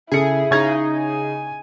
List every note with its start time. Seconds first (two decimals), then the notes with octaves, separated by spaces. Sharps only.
0.12 C#3 E4 G#4 A4 C#7
0.51 C#3 D#4 G#4 C#6 G#6
0.98 G#5